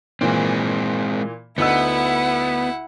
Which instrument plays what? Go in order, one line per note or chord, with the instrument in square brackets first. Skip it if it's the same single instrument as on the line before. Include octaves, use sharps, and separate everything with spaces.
[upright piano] A#2 E3 [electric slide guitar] G#3 C4
[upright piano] D2 D#4 E6 [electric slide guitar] B3 [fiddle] E4 F#5